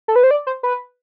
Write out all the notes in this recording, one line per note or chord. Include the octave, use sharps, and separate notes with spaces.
A4
B4
C5
D5
C5
B4